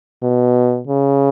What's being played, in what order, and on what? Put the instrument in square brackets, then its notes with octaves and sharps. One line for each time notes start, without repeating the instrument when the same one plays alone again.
[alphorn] B2
C#3